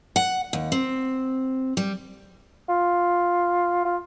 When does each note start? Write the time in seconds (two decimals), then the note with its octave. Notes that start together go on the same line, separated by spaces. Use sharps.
0.16 F#5
0.53 D#2
0.72 C4
1.77 G3
2.69 F4
3.85 F4